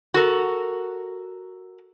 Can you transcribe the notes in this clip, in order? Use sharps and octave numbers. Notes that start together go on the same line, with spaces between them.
F#4 A4 A#4